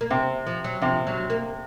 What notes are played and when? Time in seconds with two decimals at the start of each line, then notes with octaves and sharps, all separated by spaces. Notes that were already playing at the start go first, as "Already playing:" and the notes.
0.01 A#3
0.10 C3 C4
0.47 F3
0.64 F#3
0.82 C3 F3
1.07 F#3
1.30 A#3